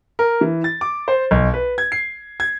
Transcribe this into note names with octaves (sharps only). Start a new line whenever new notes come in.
A#4
E3
A6
D6
C5
B1
B4
G#6
C7
G#6